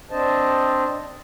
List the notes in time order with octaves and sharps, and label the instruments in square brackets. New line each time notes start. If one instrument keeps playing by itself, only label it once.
[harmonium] C4 D4 C5 D#5 A5